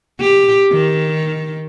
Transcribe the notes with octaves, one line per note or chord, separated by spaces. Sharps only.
G4
D#3